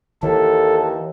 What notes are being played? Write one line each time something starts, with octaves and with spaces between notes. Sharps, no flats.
D#2 E3 A4